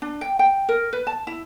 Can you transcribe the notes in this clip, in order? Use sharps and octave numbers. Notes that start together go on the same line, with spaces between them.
D4
G5
G5
A#4
B4
A5
E4